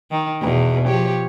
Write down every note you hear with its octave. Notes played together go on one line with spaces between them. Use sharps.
D#3
E2 B2
F3 G4 C#5